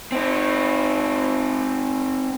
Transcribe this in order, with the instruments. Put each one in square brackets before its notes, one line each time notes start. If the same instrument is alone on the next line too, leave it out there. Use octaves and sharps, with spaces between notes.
[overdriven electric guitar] C4 D#4